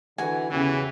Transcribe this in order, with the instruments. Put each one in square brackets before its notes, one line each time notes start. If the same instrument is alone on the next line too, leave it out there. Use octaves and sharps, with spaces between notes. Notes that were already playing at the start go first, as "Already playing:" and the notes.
[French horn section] D3 E3 [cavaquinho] F#4 G#5
[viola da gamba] E2 C#3 [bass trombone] E3 [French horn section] C#4 G4